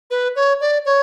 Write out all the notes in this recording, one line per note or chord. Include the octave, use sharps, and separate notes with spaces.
B4
C#5
D5
C#5